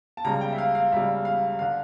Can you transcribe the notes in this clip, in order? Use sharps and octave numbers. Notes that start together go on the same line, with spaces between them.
A5
C#2 C#3 G3 A#5
G5
E5
F5
F5
C#2 C#3 G3 E5
F5
D3 F5